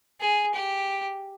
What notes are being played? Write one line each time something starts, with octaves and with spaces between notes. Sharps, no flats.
G#4
G4